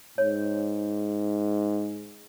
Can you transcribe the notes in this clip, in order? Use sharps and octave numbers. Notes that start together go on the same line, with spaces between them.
G#2 C#5